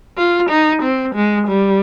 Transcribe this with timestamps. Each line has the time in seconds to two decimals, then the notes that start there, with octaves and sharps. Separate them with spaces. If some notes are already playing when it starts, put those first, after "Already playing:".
0.17 F4
0.50 D#4
0.82 C4
1.15 G#3
1.48 G3